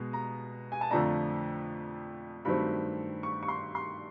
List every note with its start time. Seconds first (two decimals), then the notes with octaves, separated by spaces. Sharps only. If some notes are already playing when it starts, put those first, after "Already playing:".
Already playing: B2 G#3 B3
0.13 A#5
0.72 G#5
0.81 A5
0.91 F2 D3 F3 A3 D4 A#5
2.45 G2 D#3 F#3 A3 C4 B5
3.23 C#6
3.43 C#6
3.48 C6
3.75 C6